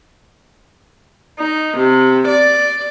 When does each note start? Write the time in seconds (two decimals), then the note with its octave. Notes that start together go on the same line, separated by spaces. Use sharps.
1.39 D#4
1.76 C3
2.28 D5